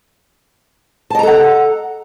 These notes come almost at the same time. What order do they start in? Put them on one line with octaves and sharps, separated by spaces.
A5 D#5 A#5 A4 F#5